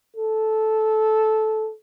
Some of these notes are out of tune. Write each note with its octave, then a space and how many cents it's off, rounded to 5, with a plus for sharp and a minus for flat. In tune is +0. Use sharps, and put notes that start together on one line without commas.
A4 -10